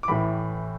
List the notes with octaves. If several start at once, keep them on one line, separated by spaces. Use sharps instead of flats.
D6
A1 A2 E3 B5